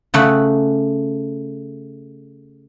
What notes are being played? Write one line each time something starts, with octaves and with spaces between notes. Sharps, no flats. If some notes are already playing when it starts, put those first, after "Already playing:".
C#3 A3 F#5